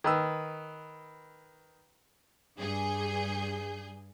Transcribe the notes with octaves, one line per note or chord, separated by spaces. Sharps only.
D#3 B4 E6
G2 G#4 G6